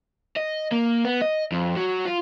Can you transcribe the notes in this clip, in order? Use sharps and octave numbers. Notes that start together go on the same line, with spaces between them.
D#5
A#3
B3
D#5
F2
F#3
F4